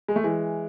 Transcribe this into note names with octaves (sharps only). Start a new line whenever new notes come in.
G#3
A3
E3 G#3